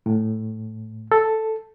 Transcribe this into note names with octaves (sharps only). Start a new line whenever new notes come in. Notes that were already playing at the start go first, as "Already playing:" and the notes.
A2
A4